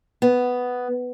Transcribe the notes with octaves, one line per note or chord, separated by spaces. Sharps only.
B3